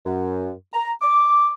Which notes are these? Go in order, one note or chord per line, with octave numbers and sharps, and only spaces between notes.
F#2
A#5
D6